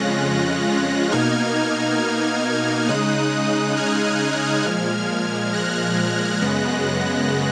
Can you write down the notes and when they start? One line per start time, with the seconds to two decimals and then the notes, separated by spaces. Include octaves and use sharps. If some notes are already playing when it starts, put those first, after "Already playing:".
Already playing: F2 C#3 G#3 C#4 F4 F#6 A#6
1.11 B2 A#3 D#4 F6 G#6
2.88 C#3 G#3 D#4 D#6 F#6
3.77 F6 G#6
4.65 A#2 F3 G#3 F6 G#6
5.53 F#6 A#6
6.42 F#2 C#3 G#3 B3